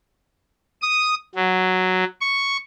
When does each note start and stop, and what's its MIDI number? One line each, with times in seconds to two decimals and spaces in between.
0.82 1.15 87
1.35 2.04 54
2.21 2.57 85